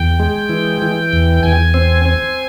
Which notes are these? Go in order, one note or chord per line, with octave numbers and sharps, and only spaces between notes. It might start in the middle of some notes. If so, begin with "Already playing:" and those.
Already playing: E2 G5
G#3
E3
E3
E2
E2 G#5
C4
C4